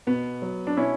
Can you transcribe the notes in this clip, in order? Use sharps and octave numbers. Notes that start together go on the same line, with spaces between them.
B2 B3
F#3
D4
B2 C#4 E4